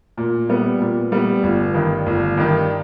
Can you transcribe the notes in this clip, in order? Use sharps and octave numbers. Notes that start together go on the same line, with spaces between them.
A#2
G3 B3
A#2
G3 B3
G1
G2 D#3
G1
G2 D#3